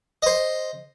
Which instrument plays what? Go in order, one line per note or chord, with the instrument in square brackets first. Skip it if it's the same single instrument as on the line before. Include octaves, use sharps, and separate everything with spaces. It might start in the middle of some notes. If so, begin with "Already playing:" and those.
[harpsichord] C5 D#5